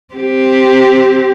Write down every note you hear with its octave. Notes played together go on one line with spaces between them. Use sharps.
C4 G4